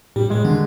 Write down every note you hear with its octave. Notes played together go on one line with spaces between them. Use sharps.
A2 G3
A2 G#3
D3 D#3